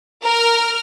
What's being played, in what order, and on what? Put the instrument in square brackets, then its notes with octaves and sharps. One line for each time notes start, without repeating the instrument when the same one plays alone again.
[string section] A#4 F6